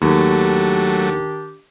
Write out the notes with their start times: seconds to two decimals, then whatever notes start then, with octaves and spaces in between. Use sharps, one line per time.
0.02 D#2 D#3 F#3 A3 D4 G4